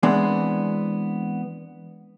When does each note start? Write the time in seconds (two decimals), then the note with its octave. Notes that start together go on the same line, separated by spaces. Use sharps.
0.03 E3 G#3 B3 C4 D4